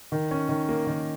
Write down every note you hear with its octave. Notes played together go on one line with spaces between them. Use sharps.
D#3
C#4
D#3
A#3
D#3